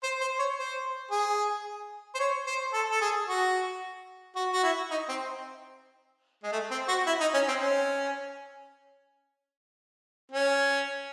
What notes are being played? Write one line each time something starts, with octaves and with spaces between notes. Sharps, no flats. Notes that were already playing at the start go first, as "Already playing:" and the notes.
C5
C5
C#5
C5
G#4
C5
C#5
C5
A4
A4
G#4
F#4
F#4
F#4
E4
D#4
C4
G#3
A3
C4
F#4
E4
D#4
C#4
C4
C#4
C#4